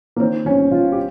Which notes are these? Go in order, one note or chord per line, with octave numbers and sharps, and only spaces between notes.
A#3
D#3 C4
G1 C#4
G1 F4
G4